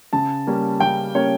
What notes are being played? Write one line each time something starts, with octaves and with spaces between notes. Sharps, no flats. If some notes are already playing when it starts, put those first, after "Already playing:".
C#3 A5
G3 A#3 C#4
C#3 G5
G3 A#3 C#4 C#5